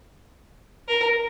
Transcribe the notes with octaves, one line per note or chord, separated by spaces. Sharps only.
A#4